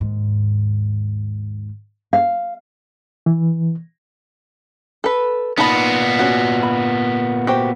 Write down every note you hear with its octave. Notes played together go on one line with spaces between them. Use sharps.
D#2 G#2
F5
E3
A4 B4
A#2 B3 D#4 A5 B5
C#4 F#4
B5
F#4 G4 C5